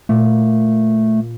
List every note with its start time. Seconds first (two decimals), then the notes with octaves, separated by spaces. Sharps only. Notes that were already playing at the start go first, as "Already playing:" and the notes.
0.09 A#2 A3